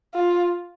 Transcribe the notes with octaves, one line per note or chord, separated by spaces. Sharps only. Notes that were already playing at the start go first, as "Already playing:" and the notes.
F4